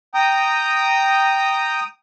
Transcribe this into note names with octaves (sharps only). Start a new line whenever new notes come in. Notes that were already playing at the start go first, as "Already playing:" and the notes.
G5 A#5 D#6